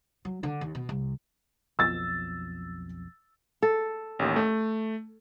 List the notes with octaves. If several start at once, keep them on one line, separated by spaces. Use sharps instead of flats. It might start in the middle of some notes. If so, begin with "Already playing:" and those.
F#3
D3
D#2
B2
C2
B1 F2 E6 A6
A4
A1 D#2
A3